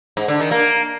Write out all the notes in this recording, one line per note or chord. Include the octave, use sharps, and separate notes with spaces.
G#2
D3
D#3
A#3